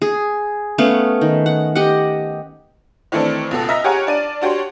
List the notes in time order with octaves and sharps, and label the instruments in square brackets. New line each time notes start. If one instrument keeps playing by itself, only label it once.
[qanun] G#4
A3 B3 C#4 F5
D#3
F#5
G4 D#5 F#5
[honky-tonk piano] D#3 E3 A3 C4 D4
C#2 B2 A4
D#5 E5 A#5 F6 A#6 B6
G4 G#4 C#5 F#5 G#5 A#5
D4 D5 D#7
D4 F#4 G4 C#5 C6